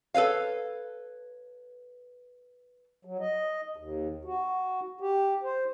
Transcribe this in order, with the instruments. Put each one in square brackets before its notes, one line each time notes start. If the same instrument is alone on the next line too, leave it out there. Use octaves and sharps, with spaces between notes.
[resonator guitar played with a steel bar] A4 B4 C#5 F5
[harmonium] F#3
D#5
D#2
F#4
G4
C5